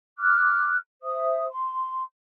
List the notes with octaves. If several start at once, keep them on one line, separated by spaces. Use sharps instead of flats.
D6 F6 F#6
C5 E5 D#6
C6